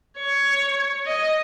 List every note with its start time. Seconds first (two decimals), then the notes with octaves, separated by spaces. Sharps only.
0.18 C#5
1.06 D#5